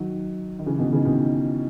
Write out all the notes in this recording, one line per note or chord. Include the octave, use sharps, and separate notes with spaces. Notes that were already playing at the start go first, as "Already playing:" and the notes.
Already playing: D#3 F#3
D#3
C#3 E3
B2 D#3
C#3 E3
B2 D#3